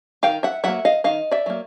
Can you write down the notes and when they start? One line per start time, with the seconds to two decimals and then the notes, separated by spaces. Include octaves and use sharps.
0.23 D#3 F5 G5
0.43 E5 F#5
0.64 F#3 A#3 E5 F#5
0.85 D#5 F5
1.04 D#3 D#5 F5
1.31 D5 E5
1.46 F#3 A#3